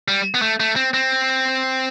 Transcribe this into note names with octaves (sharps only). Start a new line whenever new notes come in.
G3
B3
A3
A3
C4
C4